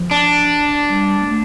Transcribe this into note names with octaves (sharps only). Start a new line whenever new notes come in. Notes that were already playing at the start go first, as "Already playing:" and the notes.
Already playing: F3
D4
G3
A#3
A3